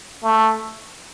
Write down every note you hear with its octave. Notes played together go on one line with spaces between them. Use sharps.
A3